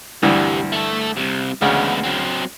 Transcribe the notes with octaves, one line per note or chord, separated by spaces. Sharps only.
D2 G2 C3 E3 G3
A3 A4
C2 C3
D2 C#3 G#3 B3
F#3 C4